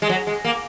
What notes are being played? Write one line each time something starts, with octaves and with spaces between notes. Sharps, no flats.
G#3
F#3
G#3
A#3